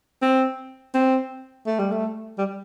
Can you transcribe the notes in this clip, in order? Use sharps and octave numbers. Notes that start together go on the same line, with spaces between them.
C4
C4
A3
G3
A3
G3